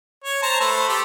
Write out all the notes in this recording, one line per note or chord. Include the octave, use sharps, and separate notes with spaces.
C#5
C5 A5 A#5
A3 B4 C5
G4 A4